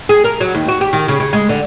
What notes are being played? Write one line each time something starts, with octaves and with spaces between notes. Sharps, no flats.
G#4
A#4
F#3
D#2
F#4
G4
D#3
C#3
C#3
G#3
D3